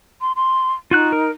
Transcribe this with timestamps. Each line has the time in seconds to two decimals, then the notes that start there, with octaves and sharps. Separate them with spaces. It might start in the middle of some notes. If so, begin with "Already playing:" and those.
0.21 C6
0.36 C6
0.91 D#4 F4 F#4 F#6
1.12 A#4